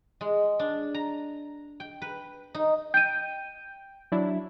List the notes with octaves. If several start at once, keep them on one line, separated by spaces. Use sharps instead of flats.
G#3
D4
A#5
G5
B4
D#4
G5 G6 D#7
F#3 D4 E4